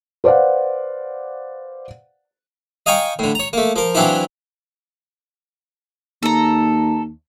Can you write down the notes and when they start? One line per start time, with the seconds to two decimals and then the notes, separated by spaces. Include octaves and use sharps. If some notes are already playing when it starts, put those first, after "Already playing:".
0.24 B4 C5 D5 F5 F#5
2.86 D#5 F5 G5 G#5 A#5 C#6
3.19 A2 D3
3.35 C#5 A#5
3.53 A3 A#3
3.76 F3 A#4
3.95 E3 F#3 C4 D4 E4 F4
6.23 D#2 A4 A#5